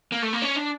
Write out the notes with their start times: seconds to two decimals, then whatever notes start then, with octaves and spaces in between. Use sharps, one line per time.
0.12 A#3
0.22 A3
0.33 A#3
0.42 C#4
0.56 D4